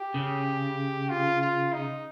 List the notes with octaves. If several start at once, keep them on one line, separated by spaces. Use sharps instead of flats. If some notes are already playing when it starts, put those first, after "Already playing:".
Already playing: G4
C#3
F4
F4
D#4